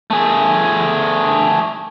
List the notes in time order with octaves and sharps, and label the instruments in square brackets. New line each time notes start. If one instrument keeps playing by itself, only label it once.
[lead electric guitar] A3 G#4